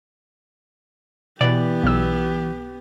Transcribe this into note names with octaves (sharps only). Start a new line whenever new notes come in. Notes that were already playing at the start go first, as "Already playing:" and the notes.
B2 E3 B3 G4 D5
B1 E6